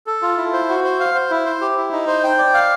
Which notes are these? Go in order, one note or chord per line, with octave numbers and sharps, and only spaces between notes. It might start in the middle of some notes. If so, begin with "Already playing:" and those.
A4
F4
E4
C5
F#4
C5
F5
C5
E4
C5
G4
E4
D#4
C5
G5
D5
F5